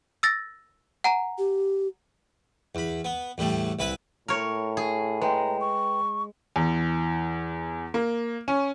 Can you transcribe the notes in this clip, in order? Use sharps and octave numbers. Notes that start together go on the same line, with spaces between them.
E6 A6 A#6
F#5 G#5 A#5
G4
E2 B5
B3
E2 A2 G3 A3
C2 E4 B4 B5
A2 A#4 C#5
G#4
G#3 B4 G5 A#5
C#6
E2
A#3
C#4